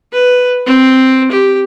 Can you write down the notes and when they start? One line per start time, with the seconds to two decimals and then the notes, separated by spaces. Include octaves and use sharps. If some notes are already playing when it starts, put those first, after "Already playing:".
0.13 B4
0.66 C4
1.31 G4